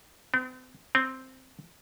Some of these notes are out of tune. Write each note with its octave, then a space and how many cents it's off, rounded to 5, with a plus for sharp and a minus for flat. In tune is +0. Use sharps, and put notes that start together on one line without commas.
C4 -45
C4 +0